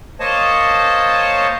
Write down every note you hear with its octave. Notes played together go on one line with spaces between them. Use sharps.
A#3 C5 C#5 D#5 A5